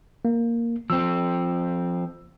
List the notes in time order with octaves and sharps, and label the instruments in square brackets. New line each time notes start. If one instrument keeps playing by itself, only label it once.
[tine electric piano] A#3
[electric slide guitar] F3 C4 [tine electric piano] E6